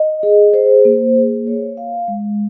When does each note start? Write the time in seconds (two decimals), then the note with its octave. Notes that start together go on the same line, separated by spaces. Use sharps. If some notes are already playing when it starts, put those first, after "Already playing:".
Already playing: D#5
0.23 G#4
0.54 C5
0.85 A#3
1.16 G#4
1.47 C#5
1.77 F5
2.08 G#3